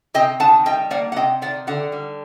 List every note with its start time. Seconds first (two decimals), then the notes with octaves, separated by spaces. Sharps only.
0.14 C3 D#5 G5
0.40 D#3 F#5 A5
0.66 G3 D#5 G5
0.91 A#3 D5 F#5
1.12 F#5
1.16 C3 D#5 G5
1.42 D#3 D5 F#5
1.67 D3 D5 F#5
1.92 G3